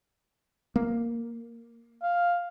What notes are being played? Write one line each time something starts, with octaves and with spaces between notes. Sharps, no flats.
A#3
F5